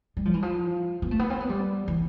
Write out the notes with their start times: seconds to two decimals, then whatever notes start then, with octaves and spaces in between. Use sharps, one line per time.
0.17 G3
0.25 F3
0.34 E3
0.42 F3
1.02 B3
1.11 A3
1.19 B3
1.30 C4
1.40 B3
1.49 G3
1.88 E3